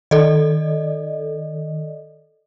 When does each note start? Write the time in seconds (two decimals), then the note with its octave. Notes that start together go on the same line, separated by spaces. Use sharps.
0.11 D#3 A4 D5 D#5